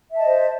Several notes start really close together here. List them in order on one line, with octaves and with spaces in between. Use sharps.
E5 A5 D#5 C5